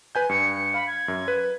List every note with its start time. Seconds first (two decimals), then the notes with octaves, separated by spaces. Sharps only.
0.15 B4 G#5 G6
0.29 G2 C#7
0.74 F5 B5
0.87 G#6
1.08 F#2
1.28 B4